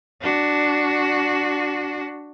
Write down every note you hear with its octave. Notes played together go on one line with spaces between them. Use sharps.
D4 F#4